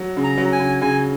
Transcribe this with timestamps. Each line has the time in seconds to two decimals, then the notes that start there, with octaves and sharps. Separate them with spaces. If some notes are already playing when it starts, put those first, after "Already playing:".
Already playing: F#3
0.17 C#3
0.23 A#5
0.38 F#3
0.52 G#5
0.59 C#3
0.81 C#3 G#5